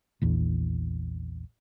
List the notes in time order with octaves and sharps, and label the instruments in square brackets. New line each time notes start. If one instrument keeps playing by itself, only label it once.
[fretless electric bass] A#1 E2